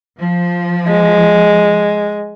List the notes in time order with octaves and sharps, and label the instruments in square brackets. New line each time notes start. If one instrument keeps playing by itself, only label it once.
[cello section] F3
[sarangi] G#3